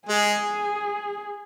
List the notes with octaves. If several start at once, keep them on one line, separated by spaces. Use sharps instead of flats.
G#3 G#4